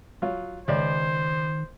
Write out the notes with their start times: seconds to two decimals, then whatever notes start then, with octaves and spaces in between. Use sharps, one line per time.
0.22 F#3 F4
0.68 C#2 D#3 C5 D5